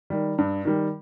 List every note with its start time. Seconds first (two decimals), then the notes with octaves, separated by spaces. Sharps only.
0.10 D#3 G3
0.38 G2
0.65 D#3 G3